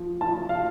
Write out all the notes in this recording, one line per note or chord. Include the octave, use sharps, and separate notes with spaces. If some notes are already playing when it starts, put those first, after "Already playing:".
Already playing: F3
F3 A5
F5